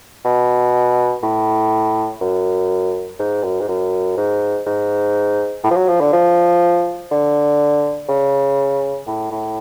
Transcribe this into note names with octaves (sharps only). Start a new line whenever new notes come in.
B2
A2
F#2
G#2
F#2
G#2
F#2
G#2
G#2
A2
F3
F#3
F3
D3
F3
D3
C#3
A2
A2